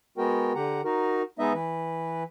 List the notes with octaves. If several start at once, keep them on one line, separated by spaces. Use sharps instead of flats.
G#3 B3 F#4 A#4 G5
D3 G4 F#5 A#5
D#4 F#4 A#4
G#3 B3 D#4 D#5 E5
E3 B4